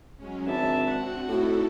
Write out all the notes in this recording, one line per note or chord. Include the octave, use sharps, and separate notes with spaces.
F#3 G#3 C#4
G#1 D4 E5 A5
C4 F#4 F#5
A2 D#4 E4 F#4 A4